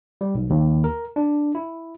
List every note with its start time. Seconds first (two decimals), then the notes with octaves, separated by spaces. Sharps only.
0.21 G3
0.35 B1
0.50 D#2
0.84 A#4
1.16 D4
1.55 E4